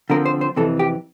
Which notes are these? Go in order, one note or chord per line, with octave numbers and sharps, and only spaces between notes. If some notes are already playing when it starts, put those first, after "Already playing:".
D3 F3 C4 A#4
C5
C5
F2 C3 E3 A4
G4